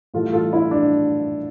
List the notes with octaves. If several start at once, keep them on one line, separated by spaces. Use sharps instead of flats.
A2 E3 G3 F4 A4
F4 A4
E4
D4